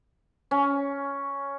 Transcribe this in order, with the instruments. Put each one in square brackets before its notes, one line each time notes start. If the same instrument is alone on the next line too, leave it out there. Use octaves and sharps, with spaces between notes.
[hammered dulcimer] C#4